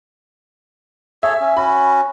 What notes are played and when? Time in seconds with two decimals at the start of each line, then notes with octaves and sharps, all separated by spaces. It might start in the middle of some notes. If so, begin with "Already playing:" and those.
1.23 G#4 A4 C#5 E5
1.40 C#4
1.57 C#4 F#4 B5